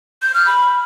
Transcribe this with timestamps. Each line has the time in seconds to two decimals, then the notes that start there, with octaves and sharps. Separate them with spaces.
0.22 G6
0.34 F6
0.46 B5